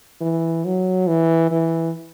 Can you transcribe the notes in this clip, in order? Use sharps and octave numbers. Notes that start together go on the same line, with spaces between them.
E3
F#3
E3
E3